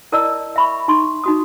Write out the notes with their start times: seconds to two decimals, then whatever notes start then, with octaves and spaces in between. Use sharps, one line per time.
0.12 E4 A#4 D5 D#5 A5 E6
0.56 E5 B5 C#6
0.88 D#4 C6 C#6
1.24 D#4 F#4 D#6